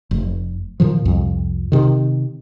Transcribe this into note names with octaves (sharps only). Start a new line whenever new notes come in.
F1
A#2 D#3 F3
C2 F2
C3 D#3